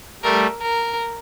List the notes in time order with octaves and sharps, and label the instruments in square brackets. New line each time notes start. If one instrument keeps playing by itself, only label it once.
[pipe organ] G3 A3 [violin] A#4
[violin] A#4